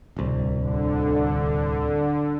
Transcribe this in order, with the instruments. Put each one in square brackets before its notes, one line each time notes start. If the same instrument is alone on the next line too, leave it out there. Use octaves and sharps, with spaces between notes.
[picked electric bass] D1 C2
[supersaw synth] D3